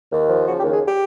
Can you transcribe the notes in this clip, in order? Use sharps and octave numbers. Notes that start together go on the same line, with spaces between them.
D#2
F3
C#3 F#4
G4
D#2
G#4
G4